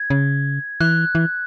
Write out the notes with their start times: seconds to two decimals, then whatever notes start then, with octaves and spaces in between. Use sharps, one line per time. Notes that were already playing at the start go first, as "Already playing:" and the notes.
Already playing: G#6
0.10 C#3
0.81 E3 F#6
1.15 E3